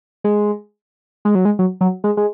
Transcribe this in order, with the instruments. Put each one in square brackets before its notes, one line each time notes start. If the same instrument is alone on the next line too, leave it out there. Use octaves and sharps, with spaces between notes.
[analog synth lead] G#3
G#3
F#3
G#3
F#3
F#3
G#3
G#3